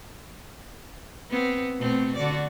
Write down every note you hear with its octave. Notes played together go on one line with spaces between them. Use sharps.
B3 C4
B2 A3 C4
D3 F#4 D5